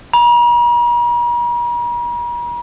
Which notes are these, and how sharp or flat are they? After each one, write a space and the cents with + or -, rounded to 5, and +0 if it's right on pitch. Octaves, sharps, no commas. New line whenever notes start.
A#5 +45